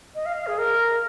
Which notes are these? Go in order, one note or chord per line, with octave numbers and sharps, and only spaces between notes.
D#5
F5
F5
G#4
A#4